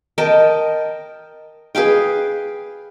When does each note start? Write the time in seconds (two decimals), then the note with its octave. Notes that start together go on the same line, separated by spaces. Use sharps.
0.18 A#4 D#5 G5 A5
1.75 G#4 B4 F5 G5